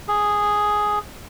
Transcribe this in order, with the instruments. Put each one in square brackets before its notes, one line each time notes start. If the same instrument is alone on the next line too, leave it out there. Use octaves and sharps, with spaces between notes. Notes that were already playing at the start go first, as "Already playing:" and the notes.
[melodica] G#4